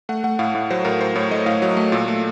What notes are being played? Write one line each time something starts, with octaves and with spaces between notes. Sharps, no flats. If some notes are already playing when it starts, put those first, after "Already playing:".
A3 F#5
A3 F#5
A2 F5
A2
F#3 C5
A2 A#4
A2 C5
A2 C#5
A3 D#5
A2 F5
F#3
A3
A#2
A3